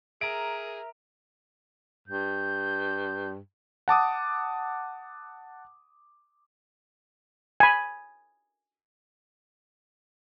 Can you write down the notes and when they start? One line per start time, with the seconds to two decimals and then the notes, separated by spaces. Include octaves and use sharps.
0.21 G#4 A#4 E5 A#5 D7
2.08 G2 G6
3.88 F#5 A5 D6 D#6
7.60 G#5 B5